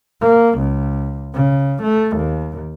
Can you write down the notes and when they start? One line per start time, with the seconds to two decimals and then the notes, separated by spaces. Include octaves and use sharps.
0.21 A#3
0.59 C#2
1.34 C#3
1.82 A3
2.17 D#2